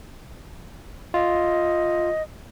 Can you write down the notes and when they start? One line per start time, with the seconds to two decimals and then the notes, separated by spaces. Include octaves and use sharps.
1.14 F4 D#5